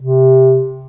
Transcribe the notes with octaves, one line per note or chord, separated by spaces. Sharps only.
C3